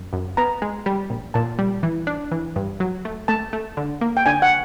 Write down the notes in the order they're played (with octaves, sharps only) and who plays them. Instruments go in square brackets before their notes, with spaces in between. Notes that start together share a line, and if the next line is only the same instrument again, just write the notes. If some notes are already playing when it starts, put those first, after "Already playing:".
Already playing: [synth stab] F#2
F#2
[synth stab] B3 [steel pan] A#5
[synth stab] G#3
G3
A#1
[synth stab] A#2 [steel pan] A5
[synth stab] G3
E3
D4
E3
G2
F#3
A3
[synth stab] A3 [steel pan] A5
[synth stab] A3
D3
A#3
[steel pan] G5
[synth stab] D3 [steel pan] G#5
[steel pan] F#5